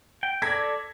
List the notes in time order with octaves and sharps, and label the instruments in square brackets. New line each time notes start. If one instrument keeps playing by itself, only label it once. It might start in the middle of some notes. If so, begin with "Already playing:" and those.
[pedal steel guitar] G5
[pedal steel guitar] A4 D5 [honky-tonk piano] G#6 A#6 B6